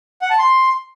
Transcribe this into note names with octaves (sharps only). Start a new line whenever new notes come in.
F#5
A5
C6